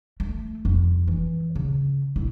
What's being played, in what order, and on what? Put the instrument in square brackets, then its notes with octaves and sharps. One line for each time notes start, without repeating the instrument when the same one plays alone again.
[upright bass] A3
F1 F4
E3
C#3
A#1 E4